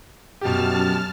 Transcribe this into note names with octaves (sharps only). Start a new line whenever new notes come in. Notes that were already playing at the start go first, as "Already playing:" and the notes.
F#2 B2 G4 A5 F6